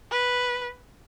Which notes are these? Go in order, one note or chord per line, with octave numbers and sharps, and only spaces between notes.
B4